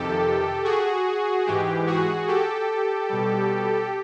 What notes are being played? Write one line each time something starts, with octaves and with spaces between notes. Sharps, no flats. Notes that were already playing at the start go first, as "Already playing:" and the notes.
Already playing: F2 C3 D#3 G4 A4
F#4 G#4
G#2 E3 G#3 G4
F#4 G#4
G4 A4
B2 G3